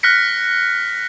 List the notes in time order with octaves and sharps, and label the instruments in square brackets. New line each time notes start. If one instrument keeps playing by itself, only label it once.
[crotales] F6 F#6 A#6 B6 C#7